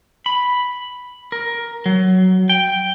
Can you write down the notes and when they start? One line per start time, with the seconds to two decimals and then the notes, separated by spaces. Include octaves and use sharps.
0.26 B5
1.32 A#4
1.86 F#3
2.49 G5